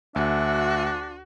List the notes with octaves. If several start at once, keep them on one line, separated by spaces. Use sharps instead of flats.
D2 D4 F#4 E5